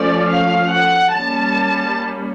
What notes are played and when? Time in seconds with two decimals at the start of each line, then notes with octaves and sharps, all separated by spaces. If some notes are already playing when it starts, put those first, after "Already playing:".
Already playing: F3 A3 C#4 D5
0.30 F5
0.72 F#5
1.12 G3 A#3 C#4 A5